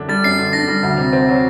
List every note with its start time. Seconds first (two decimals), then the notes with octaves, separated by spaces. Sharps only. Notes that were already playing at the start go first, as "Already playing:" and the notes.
Already playing: F#2 D3 D4
0.09 G3 A6
0.24 F#2 C7
0.39 D3
0.53 D4 A#6
0.68 G3
0.83 D2
0.98 C3
1.13 C4
1.29 F#3